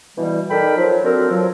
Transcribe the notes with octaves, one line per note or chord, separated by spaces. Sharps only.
B2 E3 G3
D#4 A4 A#4 D5 G5 B5
F3 F#3
A#3 C4 D4 F#4 A4 A#4
F3 F#3